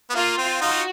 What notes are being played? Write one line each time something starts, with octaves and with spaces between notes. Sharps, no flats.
B3
A#3 F4
C4
D#4 F4 F#4